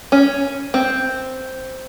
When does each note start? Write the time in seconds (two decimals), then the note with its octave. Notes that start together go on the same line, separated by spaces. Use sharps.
0.12 C#4
0.74 C4